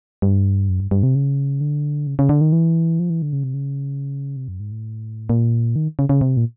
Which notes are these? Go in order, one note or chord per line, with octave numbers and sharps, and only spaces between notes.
G2
F#2
G2
G2
C3
C#3
D3
C#3
C#3
D3
D#3
E3
F3
E3
D3
C#3
C3
C#3
C3
F#2
G#2
A2
A#2
D#3
C#3
C#3
C3
A#2